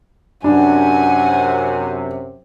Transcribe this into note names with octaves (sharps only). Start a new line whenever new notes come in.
F#2 C3 D4 F#5 G#5